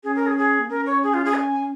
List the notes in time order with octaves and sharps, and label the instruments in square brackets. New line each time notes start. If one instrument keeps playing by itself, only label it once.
[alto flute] C#4 [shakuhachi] G#4
[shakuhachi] A#4
G#4
G#4
[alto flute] A#3
[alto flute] C#4 [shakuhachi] A#4
[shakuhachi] C#5
G#4
F4
G#4
G#5